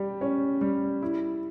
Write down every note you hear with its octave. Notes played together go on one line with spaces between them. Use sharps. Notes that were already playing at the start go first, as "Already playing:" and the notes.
Already playing: G3 G4
C#4
G3
E4